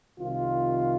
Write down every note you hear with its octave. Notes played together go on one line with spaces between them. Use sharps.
C2 C3 D#3 F4